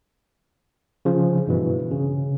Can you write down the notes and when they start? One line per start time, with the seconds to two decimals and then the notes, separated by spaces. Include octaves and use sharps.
1.05 C#3 F3
1.47 G2 B2 E3
1.91 C#3